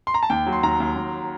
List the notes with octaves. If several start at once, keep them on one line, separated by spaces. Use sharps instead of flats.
C6
A#5
A5
D#2 G5
F#3
C6
D#2 A#5
D#2
D#2